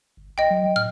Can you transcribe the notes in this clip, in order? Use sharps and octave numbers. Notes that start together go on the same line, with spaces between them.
G1
A#1 D#5 G5
F#3
A2 F6